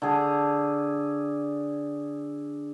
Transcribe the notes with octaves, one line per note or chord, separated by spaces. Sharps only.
D3 G#4